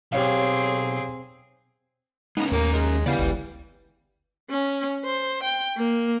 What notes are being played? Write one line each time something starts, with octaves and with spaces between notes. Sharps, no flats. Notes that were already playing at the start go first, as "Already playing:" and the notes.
B1 C4 G4 G#4 C#5 F5
G#3 A#3 B3 C#4 D#4 A#5
D#2 A2 A#3 C#4 F5 A#5
G#3 A#4
C#3 E3 B3 G4 D5 F5
G1 C#2
C#4
C5
G5
A#3